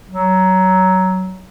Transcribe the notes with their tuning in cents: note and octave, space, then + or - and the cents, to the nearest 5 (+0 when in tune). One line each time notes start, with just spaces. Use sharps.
F#3 +15